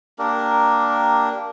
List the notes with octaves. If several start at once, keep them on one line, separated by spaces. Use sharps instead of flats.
A#3 D4 G4 A#4